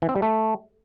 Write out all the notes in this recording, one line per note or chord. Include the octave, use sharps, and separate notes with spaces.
E3
C4
G3
A3